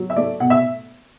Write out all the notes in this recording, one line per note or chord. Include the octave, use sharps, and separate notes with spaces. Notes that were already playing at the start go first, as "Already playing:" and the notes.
Already playing: F#3
E5
A3 D5
B2 F#5
E5